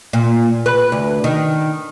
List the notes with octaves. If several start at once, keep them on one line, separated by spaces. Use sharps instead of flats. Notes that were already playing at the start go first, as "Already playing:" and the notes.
A#2
B4
D2
D#3